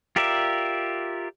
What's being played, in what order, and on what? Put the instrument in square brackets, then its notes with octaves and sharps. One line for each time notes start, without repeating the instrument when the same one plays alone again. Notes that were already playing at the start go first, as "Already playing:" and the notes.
[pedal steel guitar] F4 G4 A#4 D5 E5